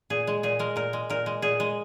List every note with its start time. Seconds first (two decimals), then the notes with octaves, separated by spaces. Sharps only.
0.10 A#2 G#4
0.27 G#3
0.43 A#2 G#4
0.59 G#3 A#4
0.76 A#2 A#4
0.93 G#3
1.10 A#2 A#4
1.26 G#3
1.42 A#2 G#4
1.60 G#3